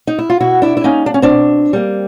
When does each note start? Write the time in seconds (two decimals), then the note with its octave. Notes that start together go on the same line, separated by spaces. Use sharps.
0.07 D#4
0.18 E4
0.30 F4
0.40 B2 E4 F#4
0.62 D4 E4
0.77 E4
0.84 G3 A#3 C#4 D#4
1.06 D4
1.14 C#4
1.22 C4 D4
1.29 B2
1.73 G3 A#3